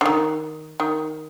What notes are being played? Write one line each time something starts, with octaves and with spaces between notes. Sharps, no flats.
D3
D#3
D#3